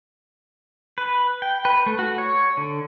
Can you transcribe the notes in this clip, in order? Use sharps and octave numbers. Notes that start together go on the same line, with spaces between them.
B4
G5
B4
A3
F#4
C#5
D3